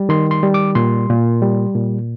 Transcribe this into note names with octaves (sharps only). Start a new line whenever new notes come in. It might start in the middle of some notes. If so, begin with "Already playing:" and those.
Already playing: G3
D#3 C6
C6
G3
D6
A#2 C6
A#2
G3
A#2